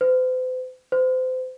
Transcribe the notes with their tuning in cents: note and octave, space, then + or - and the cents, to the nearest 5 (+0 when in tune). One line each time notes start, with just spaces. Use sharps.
C5 -45
C5 -30